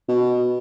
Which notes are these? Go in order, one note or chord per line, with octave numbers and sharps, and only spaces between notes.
B2